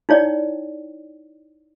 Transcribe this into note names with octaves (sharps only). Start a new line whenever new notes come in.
D#4 E4 C#5 D5 G5